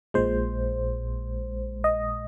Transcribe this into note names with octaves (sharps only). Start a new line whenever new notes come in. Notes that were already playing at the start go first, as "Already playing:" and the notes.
A#1 A#2 G#3 C5
D#5